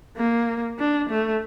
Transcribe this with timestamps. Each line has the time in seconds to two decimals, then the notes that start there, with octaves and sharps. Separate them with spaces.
0.17 A#3
0.79 D4
1.09 A3